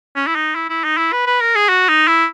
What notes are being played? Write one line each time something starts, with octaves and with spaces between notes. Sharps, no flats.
C#4
E4
D#4
E4
E4
D#4
E4
B4
B4
A#4
G#4
F#4
D#4
E4